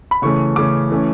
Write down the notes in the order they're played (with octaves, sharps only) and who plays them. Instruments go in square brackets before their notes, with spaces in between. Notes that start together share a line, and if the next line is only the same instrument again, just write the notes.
[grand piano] B5
C#3 E3 A3 C#4 C#6
C#3 E3 A3 C#4 D6
E3 A3 C#4